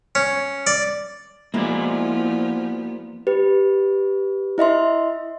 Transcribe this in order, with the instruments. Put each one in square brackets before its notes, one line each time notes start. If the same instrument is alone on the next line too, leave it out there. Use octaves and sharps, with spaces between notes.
[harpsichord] C#4
D5
[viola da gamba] F3 B3 [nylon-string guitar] G#3 E4 [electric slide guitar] A#3 F#4 D5
[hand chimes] G4 B4
E4 D#5 E5 C6